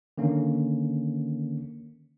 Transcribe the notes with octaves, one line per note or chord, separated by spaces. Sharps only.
D3 D#3 A#3 C#4